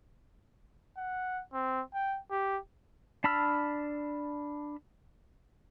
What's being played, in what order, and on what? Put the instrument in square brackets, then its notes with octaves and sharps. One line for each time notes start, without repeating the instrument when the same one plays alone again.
[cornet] F#5
C4
G5
G4
[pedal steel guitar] D4 A5 B5 E6 F6